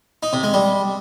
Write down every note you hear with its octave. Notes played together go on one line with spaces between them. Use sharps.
D#4
C3
G#3
G3